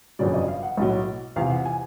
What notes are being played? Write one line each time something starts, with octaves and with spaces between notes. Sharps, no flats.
G1 F2 C#3 F#3 D5
D#5
F5
F#5
B1 A2 F#3
E2 C3 F3 F5
F#5
G#5